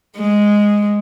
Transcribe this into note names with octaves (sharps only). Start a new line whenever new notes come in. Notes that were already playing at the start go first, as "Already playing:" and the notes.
G#3